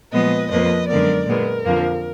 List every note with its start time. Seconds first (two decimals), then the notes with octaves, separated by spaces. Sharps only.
0.12 A#2 F3 G#3 B3 B4 D#5
0.50 F2 F3 A#3 B4 D#5
0.88 F#2 D3 G#3 B3 A#4 D5
1.26 A#2 G#3 B3 A#4
1.65 F2 D3 F3 A#3